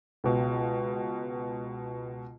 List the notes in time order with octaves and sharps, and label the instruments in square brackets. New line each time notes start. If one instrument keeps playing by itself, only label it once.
[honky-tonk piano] C#2 B2